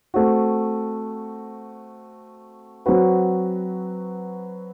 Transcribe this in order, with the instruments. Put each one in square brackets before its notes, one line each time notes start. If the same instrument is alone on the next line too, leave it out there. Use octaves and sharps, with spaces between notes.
[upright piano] A3 C4 F#4
F#3 C4 F#4 B4